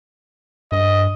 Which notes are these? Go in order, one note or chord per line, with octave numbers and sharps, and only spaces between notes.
G2 D#5